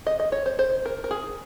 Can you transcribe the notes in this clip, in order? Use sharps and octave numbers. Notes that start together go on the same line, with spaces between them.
D#5
D#5
C#5
C5
C5
A#4
A#4
G#4